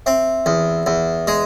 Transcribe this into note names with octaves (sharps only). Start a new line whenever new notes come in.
C4 E5
E2
E2 E5
G#3